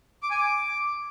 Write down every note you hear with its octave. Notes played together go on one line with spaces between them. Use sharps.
D6
G#5
D6